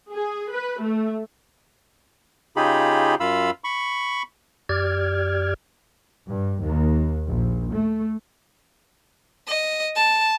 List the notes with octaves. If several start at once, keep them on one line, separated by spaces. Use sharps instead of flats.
G#4
B4
A3
C#3 D#4 F4 G4 G#4 B5
F#2 F4 F5 B5 E6
B5 C#6
F#2 G4 D5 F6 G#6
G2
D#2
A#1
A3
D#5
A5